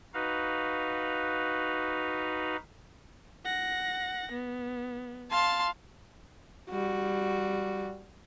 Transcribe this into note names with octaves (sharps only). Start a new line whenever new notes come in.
D#4 F#4 B4 F5
F#5 A#6
B3
F5 A5 C6
G3 F#4